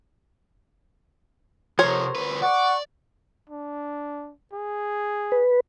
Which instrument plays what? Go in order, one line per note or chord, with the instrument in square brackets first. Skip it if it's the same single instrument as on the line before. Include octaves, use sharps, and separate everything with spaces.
[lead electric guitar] C3 F3 [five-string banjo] A#4 C5 C#5
[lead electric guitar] D2 B4
[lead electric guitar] D5 [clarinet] F#5 [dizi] C#6
[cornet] D4
G#4
[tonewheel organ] B4